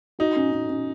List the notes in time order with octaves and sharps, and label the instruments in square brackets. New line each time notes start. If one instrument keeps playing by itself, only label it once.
[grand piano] D#4 [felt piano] F#4
[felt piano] C#4
C#4
C#4